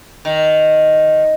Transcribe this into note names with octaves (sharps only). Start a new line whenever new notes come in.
D#3